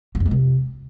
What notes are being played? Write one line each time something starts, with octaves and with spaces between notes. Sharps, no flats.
F#3
F2
G#3
C3